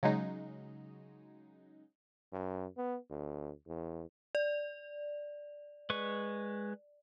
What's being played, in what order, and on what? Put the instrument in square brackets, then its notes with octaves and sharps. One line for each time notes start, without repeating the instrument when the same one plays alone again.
[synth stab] C#3 F#3 G#3 D#4
[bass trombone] F#2
B3
D2
E2
[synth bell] D5
[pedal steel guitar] G#3 B4 C#6